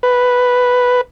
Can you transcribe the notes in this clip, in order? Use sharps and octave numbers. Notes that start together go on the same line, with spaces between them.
B4